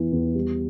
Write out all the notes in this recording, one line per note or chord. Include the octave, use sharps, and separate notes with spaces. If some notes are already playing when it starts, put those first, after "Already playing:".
Already playing: E2 E3
E2
G3